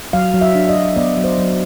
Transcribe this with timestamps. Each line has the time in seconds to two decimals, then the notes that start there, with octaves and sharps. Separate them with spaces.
0.13 F#3 F5
0.34 F#3
0.41 E5
0.55 D4
0.69 D#5
0.76 F#3
0.96 B3 D5
1.17 F#3
1.24 C5
1.38 F#3